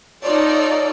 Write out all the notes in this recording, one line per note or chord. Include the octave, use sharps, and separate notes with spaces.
D#4 F4 A4 C#5 D5